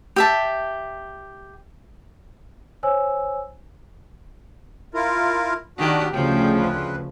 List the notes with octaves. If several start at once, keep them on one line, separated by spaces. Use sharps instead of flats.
G4 E5 A5
C5 C#5 G#5 E6
E4 F4 A#4
D#3 D4 F#4 G4
D2 C#3 F3 G5
C4 B4